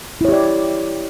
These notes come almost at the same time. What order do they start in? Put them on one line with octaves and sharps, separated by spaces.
E4 C#5 G4 D5